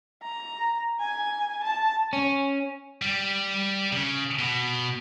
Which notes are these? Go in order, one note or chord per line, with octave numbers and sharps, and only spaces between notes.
A#5
G#5
A5
C#4
G3
C#3
B2